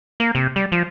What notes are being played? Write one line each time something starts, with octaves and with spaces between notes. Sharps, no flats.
A#3
C3
G3
F3